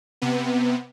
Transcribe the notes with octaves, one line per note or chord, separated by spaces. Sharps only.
C3 B3